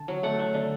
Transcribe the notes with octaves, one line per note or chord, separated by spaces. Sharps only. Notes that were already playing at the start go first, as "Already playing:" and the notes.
Already playing: D3 A5
F#3
A3 F#5
A3
D3